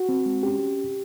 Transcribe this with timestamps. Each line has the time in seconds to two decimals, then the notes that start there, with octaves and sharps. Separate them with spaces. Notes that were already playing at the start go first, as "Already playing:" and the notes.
Already playing: F#4
0.09 C4
0.26 G#3
0.43 C#4 G4